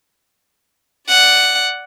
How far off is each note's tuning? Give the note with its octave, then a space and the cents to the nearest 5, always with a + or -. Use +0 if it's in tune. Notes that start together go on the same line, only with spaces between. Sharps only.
D5 +0 F#5 +0